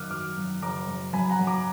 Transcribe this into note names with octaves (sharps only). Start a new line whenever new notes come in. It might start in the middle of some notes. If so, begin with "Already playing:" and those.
Already playing: F#2 D#3 D6 D#6 F6 F#6
F#3 D6 F6
F#2
F#1 A#5 D6
F#2
F#2 G#5 B5
F#5 A#5
F#2
A#5 D6